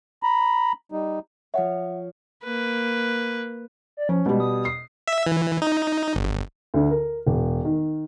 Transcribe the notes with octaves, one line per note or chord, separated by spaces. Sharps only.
A#5 B5
G3 D#4
F3 C#5 E5 F#5
A#3 B4
D5
F3 C#4
B2 G3 G#3
D#6
C7
E5
E3
D#4
G1
D2 D3
A#4
E1
D#3